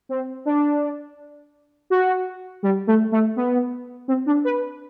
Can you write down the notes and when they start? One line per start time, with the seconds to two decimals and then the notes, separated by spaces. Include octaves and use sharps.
0.09 C4
0.45 D4
1.90 F#4
2.63 G3
2.87 A3
3.12 A3
3.36 B3
4.08 C4
4.26 D4
4.45 B4